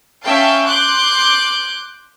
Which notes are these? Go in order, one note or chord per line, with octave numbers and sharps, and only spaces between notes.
C#4 E5 F5 G5 A5
C6 D6 F#6 G6